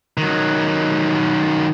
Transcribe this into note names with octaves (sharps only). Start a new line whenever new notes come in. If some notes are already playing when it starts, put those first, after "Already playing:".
D#3 F#3